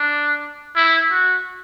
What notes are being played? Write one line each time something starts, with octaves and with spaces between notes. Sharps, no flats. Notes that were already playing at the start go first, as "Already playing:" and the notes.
Already playing: D4
E4
F#4